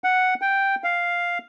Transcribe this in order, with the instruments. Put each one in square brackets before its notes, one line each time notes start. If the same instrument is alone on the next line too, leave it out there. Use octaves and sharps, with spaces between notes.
[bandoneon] F#5
G5
F5